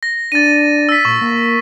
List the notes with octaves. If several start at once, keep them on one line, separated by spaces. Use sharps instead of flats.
A#6
D4 A6 D#7
E6 B6
A#2 C#6
A#3